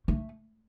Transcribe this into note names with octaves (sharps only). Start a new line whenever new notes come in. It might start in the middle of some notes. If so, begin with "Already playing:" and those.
A3